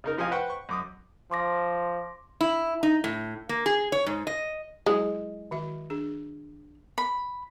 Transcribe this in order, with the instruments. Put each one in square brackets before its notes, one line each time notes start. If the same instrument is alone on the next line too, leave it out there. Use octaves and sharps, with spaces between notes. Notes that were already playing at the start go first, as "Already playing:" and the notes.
[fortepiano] C#3 D#4 A#4
C3 F3 D#5 F5 G#5
B4 C5 F#5 G5 C#6
C#6
F#2 D6 D#6
[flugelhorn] F3 [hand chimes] C6 D6 A#6
[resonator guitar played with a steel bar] E4
D#4
A2
A#3
G#4
C#5
G#2
D#5
[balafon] F#3 E4 G#4 [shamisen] G#3
[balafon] D#3 F#4 E5
D4 G#4
[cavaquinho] B5